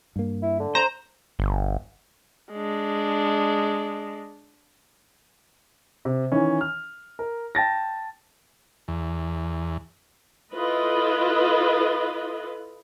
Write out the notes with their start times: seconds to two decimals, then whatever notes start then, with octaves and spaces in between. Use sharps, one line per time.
0.16 G2 A#3
0.43 E4
0.60 D3
0.75 C5 A#5
1.39 G1
2.52 G#3 D4
6.05 C3
6.32 D#3 E3 C#4
6.61 F6
7.19 A#4
7.55 G5 A5 A6 A#6
8.88 E2
10.55 E4 F4 A4 B4 D#5